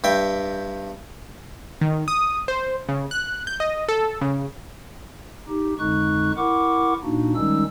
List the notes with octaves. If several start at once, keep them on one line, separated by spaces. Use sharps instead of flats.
G2 E5 G5
D#3
D#6
C5
C#3
F#6
G6
D#5
A4
C#3
D#4 G4
F2 D3 G#3 D#4 C#6 F#6
E4 A#4 F#5 C#6 D6
A#2 A#3 D4 D#4 F#4
D#3 G3 G#3 C#4 D#4 E6